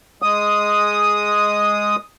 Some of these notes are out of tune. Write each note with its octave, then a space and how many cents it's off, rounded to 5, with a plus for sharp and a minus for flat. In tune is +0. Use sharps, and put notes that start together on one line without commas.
G#3 +0 D#6 +0